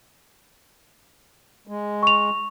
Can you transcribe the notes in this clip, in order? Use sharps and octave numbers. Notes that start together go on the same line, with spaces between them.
G#3
C#6 F7